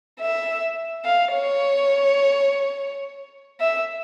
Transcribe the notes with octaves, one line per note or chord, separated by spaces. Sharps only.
E5
F5
C#5
E5